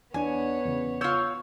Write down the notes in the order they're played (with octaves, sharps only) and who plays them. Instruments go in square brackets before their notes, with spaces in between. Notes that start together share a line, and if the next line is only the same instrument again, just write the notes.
[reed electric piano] E2 D4 D5 [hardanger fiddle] B3 C#5 [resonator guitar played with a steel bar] G#5
[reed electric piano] E2 C#3
[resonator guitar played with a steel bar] F4 C#5 [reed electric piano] E6 G6